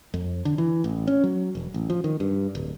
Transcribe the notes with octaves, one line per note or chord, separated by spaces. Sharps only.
F2
D3
E3
A1
C#4
F#3
E1
A1
F3
D#3
G2
D1